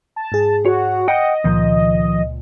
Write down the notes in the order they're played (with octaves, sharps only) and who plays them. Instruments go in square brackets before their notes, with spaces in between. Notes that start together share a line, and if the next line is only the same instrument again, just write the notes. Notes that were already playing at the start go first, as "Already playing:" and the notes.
[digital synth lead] A5
[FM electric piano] G#2 G#4
[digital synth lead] F#4 [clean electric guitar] C#5
[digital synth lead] D#5 [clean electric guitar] F#5 G5
[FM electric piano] C#2 A#2 [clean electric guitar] D#3 F3